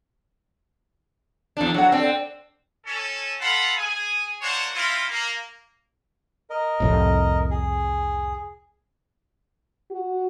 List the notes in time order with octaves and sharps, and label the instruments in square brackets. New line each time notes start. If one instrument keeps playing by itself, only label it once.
[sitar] E2 D4
[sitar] F#3 [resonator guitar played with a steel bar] A4 F#5
[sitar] C4 [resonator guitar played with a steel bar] D4 A4 G5
[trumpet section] C#4 A4
F4 A4 F5 F#5 B5
G#4 G#5
A#3 D4 C5 C#5 F#5
C4 E4 F4
A#3
[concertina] A#4 D#5
[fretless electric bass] C2 F2 A2
[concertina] G#4
[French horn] F#4